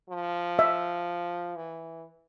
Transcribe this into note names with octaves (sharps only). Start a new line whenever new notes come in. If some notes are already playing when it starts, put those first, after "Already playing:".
F3
E5
E3